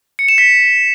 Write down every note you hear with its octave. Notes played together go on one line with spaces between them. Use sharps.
C#7
E7
B6